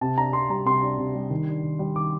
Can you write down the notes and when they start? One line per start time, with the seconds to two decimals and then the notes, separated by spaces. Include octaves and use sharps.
0.01 C3 A5
0.17 D4 A#5
0.33 C3 C6
0.50 G3 A#5
0.65 C3 C6
0.82 D4
0.98 C3
1.15 G3
1.30 D#3
1.47 D4
1.63 D#3
1.79 G3
1.96 D#3 D6